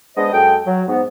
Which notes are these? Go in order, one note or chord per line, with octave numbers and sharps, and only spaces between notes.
G#3 B3 D4 C5 D#5
F#2 G#3 A4 G5
F#3
G#2 B3